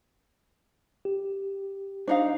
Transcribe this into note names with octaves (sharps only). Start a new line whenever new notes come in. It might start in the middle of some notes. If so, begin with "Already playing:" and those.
G4
D4 D#4 C5 F5